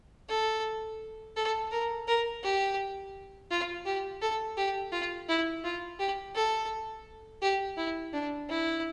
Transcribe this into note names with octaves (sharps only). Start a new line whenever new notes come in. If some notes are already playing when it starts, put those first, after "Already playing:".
A4
A4
A#4
A#4
G4
F4
G4
A4
G4
F4
E4
F4
G4
A4
G4
E4
D4
E4